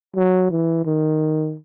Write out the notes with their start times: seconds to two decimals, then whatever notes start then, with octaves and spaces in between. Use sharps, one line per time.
0.16 F#3
0.51 E3
0.85 D#3